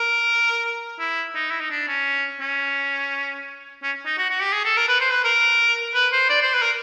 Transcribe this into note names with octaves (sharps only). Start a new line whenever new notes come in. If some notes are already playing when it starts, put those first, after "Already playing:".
Already playing: A#4
E4
D#4
E4
D#4
D4
C#4
C#4
C#4
D#4
F#4
F#4
G4
G#4
A4
A#4
B4
C5
B4
A#4
B4
C5
D5
C5
B4
A#4